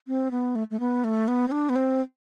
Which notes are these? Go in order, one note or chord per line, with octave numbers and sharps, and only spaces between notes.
C4
B3
A3
A3
B3
A3
B3
C4
D4
B3
C4